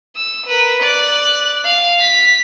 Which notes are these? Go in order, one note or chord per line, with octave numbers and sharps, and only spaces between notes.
E6
A#4 B4
D5 F#6
F5
B6